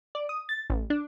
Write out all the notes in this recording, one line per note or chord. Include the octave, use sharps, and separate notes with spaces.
D5
D#6
A6
A1
D4